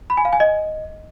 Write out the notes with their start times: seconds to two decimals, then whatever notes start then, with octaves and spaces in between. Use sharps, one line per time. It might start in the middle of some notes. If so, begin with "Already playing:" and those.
0.10 B5
0.17 G#5
0.25 F5
0.33 G#5
0.40 D#5